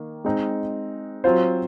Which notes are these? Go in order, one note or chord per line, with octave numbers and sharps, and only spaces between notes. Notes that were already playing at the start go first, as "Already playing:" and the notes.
Already playing: D#3 A#3
G#3 C4 D#4
F#3 C4 F4 C5